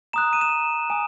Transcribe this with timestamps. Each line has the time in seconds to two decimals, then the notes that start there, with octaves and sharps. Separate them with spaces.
0.13 A#5 D#6 F#6 E7
0.33 D#7
0.41 E7
0.49 D#7
0.90 G#5 D#6